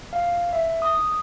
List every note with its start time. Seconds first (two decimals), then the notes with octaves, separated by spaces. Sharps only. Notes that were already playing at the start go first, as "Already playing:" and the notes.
0.13 F5
0.53 E5
0.82 D#6